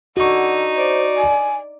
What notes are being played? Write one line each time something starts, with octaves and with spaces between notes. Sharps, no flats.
D3 D#4 F#4 F#5 C#6
C5 D5
G#5